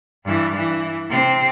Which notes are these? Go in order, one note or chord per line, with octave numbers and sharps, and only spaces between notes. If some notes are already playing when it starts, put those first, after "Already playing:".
G2 E3
E3
C3 C4